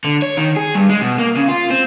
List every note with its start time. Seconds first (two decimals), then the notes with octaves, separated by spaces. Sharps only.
0.04 D3
0.22 C#5
0.37 D#3
0.57 G#4
0.75 G2
0.89 G#3
1.01 B2
1.18 A#3
1.37 C#3
1.49 F4
1.71 C4